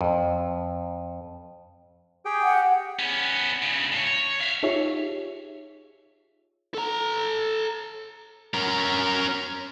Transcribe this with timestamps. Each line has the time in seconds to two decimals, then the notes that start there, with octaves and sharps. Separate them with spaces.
0.01 F2
2.25 G4 G#4 G5
2.43 F#5
2.99 B3 C#4
3.63 D2 C#3
3.92 A2 C#5
4.07 C#5
4.41 E5 F5
4.63 D#4 F4 G4 G#4 C#5 E5
6.74 A4 A#5
8.54 C#4 A#4